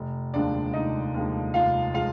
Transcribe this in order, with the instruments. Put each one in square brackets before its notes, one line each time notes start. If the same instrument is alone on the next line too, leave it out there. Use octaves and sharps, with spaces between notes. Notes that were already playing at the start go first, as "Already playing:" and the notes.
Already playing: [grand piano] F1
D#2 D3 F3 G#3 D4 D5
F1 D#4 D#5
D#2 D3 F3 G#3
F1 F4 F5
F3 G#3 F4 F5